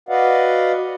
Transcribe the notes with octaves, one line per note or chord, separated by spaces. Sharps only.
F#4 B4 D5 D#5 F5 F#5